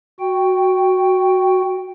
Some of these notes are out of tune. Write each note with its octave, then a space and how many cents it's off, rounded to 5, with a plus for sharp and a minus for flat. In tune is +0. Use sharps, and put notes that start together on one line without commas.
F#4 +0 G5 +0